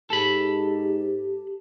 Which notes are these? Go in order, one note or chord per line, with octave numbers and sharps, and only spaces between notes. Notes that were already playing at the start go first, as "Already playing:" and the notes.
G#2 G4 A4 B5